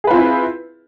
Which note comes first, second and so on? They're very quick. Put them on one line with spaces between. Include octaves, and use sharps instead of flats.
G#4 B4 F4 C4 E4